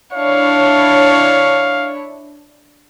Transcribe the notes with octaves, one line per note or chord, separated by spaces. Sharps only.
D4 E4 C#5 F5